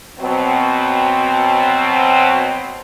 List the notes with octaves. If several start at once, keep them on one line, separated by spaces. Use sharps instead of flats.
B2 F#3 C4